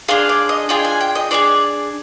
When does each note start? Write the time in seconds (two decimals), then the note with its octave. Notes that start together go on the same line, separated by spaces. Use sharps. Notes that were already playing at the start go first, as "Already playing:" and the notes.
0.08 D4 F4 G#4 F5
0.29 D5
0.49 D#5
0.69 D4 F4 G#4 G5
0.85 G#5
1.01 G5
1.15 D#5
1.31 D4 F4 G#4 D5